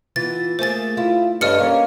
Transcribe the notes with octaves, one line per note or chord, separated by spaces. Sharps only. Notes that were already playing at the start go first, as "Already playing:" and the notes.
E3 B3 F4 A6
A3 A#3 G#4 C5 A6
E4 F4
G2 A3 C#4 D5 D#5 F6 C#7
A#3 C#4 A#4